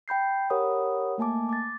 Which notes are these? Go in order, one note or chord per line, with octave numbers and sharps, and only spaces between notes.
G5 B5 G6 C7
G4 A#4 C#5 F#5 B5 D#6
A3 A#3 G#5 A5 D6
D6 A6